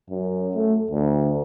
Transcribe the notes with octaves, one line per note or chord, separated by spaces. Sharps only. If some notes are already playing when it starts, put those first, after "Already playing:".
F#2
A3
D2